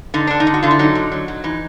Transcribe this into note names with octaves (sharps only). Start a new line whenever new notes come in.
D3 D#4
D3 D4
D#4
D3
F#4
D3 F4
E4
F#3 D#4
D3
F#3
F#3
E3 D#4